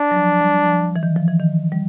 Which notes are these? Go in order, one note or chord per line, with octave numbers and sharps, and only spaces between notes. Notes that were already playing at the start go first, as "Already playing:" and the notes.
Already playing: D4
F#3
F3
G3
F3
E3
D#3
F3
E3
D#3
G3